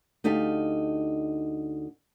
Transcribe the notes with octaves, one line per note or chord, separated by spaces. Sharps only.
D2 D#4 G4 A4 F5